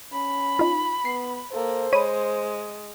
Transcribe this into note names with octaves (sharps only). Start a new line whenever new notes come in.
C#4 B5
D#4 F4
B3 C7
A#3 A4 C5
G#3 C#5 B5 D#7